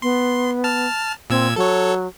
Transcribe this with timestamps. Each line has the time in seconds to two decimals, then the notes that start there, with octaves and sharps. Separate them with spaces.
0.02 B3 C6
0.64 A5 F6
1.30 A#2 C4 E6 G#6
1.56 F#3 A4 C#5